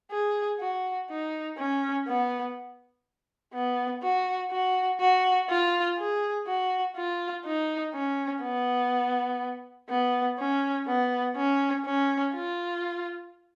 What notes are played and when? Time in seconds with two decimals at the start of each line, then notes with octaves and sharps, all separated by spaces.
0.11 G#4
0.60 F#4
1.09 D#4
1.58 C#4
2.07 B3
3.54 B3
4.02 F#4
4.51 F#4
5.00 F#4
5.49 F4
5.98 G#4
6.47 F#4
6.96 F4
7.45 D#4
7.94 C#4
8.42 B3
9.89 B3
10.39 C#4
10.87 B3
11.36 C#4
11.86 C#4
12.34 F4